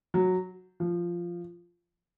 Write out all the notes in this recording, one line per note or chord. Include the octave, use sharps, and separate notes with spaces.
F#3
F3